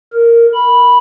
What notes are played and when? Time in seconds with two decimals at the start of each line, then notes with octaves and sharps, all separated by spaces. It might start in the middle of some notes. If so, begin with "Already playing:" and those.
0.13 A#4
0.54 B5